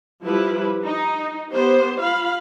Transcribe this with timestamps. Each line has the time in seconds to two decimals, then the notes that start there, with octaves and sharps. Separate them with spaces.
0.23 F3 G3 E4 B4
0.85 D#4
1.51 B3 G4 C5
2.00 F4 F5 B5